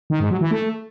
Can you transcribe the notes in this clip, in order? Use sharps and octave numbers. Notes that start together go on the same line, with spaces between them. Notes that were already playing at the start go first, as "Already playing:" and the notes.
D#3
G#2
F#3
E3
A3